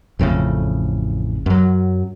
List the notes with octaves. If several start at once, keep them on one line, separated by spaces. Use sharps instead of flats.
A1 F2 A2 C#3
F#2 F#3